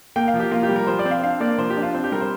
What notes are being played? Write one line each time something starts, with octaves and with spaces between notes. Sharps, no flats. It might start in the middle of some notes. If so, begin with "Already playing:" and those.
A#3 G5
F5
F3
G4
A#3 F4
G4
G3
A#4
F3 C5
D5
C4
F5
D4 F5
A#3 D5
F3 C5
G4
D4
F4
C4
G4
G3 A#4
C5